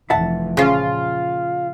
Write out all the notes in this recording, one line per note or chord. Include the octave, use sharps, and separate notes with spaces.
F1 F2 E3 E5 F#5 A5
A#2 C#3 F3 F4